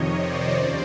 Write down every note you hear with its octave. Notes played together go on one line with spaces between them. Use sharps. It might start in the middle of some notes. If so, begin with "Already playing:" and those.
Already playing: F2 C3 D#3 C#5 D#5
C5 D5
D#2 C#3